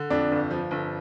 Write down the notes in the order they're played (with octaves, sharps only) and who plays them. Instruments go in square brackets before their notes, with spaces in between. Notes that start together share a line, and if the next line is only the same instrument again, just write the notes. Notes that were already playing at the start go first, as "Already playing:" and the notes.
Already playing: [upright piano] D3
[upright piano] F2 [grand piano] D4
[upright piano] G1
F3
G1